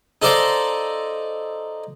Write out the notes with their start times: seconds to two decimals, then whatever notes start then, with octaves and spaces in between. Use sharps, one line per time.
0.22 D#4 A4 C5 D5 D#5 F5